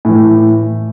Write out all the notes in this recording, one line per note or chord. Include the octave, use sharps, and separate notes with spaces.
A2 E3